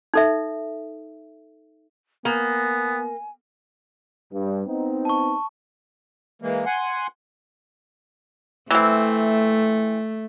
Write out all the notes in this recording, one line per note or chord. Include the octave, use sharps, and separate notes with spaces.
D#4 A4 E5
A#3 B3 G#5
G2
B3 C4 D#4
A5 C#6
E3 G#3 A#3
F#5 G#5 C6
E3 A3 C4